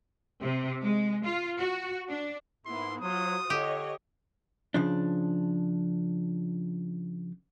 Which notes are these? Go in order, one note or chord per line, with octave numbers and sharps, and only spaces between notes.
C3
G#3
F4
F#4
D4
G#2 A#3 B3 E4 C6
F#3 F4 F#4 C5 D#6
D3 G4 C#5 D#5
C#3 F3 D4